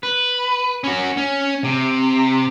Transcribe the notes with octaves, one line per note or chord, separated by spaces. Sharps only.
B4
C#4 F#4
C#4
C3